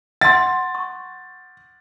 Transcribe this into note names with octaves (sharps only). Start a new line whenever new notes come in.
F#5 C6 A6
C#6